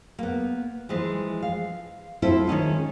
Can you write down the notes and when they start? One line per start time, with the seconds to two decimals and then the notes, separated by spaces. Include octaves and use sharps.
0.19 A#3 B3
0.89 E3 F3 G#3
1.42 F5
2.22 C4 E4 F4 A4
2.47 D#3 G#3 C#4 D#4